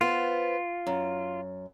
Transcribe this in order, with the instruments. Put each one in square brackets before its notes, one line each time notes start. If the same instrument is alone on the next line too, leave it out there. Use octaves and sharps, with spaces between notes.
[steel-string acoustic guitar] B3 C5 [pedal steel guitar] F4
[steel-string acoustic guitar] F#2